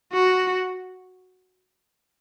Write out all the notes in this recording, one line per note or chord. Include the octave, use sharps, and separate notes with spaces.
F#4